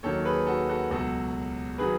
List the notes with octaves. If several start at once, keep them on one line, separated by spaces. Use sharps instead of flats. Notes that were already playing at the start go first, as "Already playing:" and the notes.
D#2 D#3 F#3 A4 C#5
G#4 B4
F#4 A4
F#4 A4
C#2 B2 F#3 F#4 A4
D#3 F#3 G#4 B4